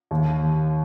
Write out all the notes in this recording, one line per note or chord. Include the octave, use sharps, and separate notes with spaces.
D#2